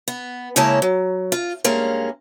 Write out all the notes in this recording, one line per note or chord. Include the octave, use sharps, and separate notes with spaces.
B3
C#3 G#3 A#3 C#4 E4 A5
F#3
F4
G2 G#3 A#3 C#4